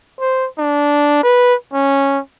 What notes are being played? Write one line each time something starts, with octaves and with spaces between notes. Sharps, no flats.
C5
D4
B4
C#4